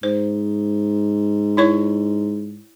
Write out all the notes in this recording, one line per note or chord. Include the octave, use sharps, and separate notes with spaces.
G#2 C5
E4 C#5 C#6